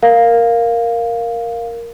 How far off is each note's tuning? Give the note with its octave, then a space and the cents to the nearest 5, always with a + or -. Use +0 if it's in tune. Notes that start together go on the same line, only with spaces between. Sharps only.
A#4 +0 F5 +0